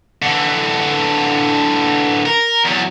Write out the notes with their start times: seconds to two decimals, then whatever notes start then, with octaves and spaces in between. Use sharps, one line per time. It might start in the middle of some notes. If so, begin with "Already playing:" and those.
0.22 D3 E3
2.26 A#4
2.65 E2 F#3